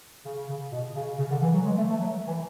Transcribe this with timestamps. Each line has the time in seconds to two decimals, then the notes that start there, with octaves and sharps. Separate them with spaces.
0.25 C#3
0.48 C#3
0.71 B2
0.95 C#3
1.18 C#3
1.30 D3
1.42 E3
1.53 F#3
1.65 G#3
1.76 A3
1.88 A3
2.00 F#3
2.27 E3